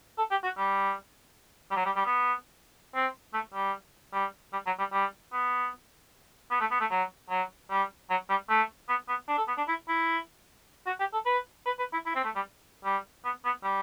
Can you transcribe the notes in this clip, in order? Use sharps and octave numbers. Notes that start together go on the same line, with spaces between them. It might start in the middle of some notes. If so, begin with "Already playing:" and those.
A4
G4
F#4
G3
G3
F#3
G3
G3
B3
C4
A3
G3
G3
G3
F#3
G3
G3
B3
B3
A3
B3
A3
F#3
F#3
G3
F#3
G3
A3
B3
B3
D4
A4
B3
D4
E4
E4
F#4
G4
A4
B4
B4
B4
E4
E4
C4
A3
G3
G3
B3
B3
G3